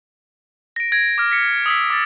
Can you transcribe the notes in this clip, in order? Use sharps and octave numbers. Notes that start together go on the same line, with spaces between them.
A#6 D7
G#6 A#6 D7
D6 F6
B6 C#7
D#6 E6 B6
D6 A6